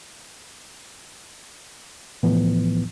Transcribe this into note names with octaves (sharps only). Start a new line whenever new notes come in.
C2 A2 E3 F3 B3